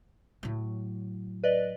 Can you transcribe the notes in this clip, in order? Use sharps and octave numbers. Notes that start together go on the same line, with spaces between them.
A2 F#3
B4 D5 D#5